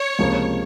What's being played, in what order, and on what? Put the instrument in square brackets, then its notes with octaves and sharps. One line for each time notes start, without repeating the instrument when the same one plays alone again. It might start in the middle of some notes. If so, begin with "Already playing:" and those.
Already playing: [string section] C#5
[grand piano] C#2 C3 F3 A#3